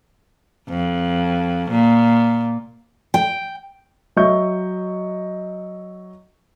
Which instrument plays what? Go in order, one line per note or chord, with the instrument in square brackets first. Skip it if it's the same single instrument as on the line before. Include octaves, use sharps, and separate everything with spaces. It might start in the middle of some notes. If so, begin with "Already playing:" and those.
[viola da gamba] F2
A#2
[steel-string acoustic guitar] G5
[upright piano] F#3 D#5 E5 C#6 G6